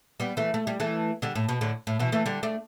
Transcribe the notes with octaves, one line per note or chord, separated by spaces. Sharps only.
G3 B3
E3 A3
A3
G3
E3 A3
D3 G3
A2
B2
A2 D3
A2
B2 E3
E3 A3
D3 G3
A3 D4